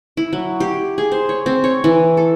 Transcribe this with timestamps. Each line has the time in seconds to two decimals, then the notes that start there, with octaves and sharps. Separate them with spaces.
0.17 E4
0.33 F#3
0.60 G4
0.98 G#4
1.12 C5
1.29 C#5
1.46 C4
1.64 C#5
1.84 E3
2.17 A4